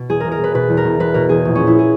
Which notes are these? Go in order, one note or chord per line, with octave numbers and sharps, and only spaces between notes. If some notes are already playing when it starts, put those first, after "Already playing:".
Already playing: B2
E2 G#4
E1 A#4
A#4
E1 B4
B2 B4
E2
A#4
E1
E1 B4
B2 A#4
E2 G#4
A#1
A#2 C#4
E4
G#4